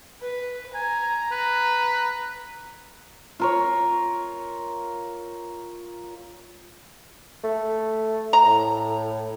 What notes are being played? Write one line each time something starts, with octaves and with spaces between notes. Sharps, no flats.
B4
G#5 A#5
B4
F4 A#4 C#5
A3
A#5
A2